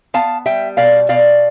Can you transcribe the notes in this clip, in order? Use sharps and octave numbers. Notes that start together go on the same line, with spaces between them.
B3 F5 A5
G3 E5 G5
B2 D5 F5
B2 D5 F5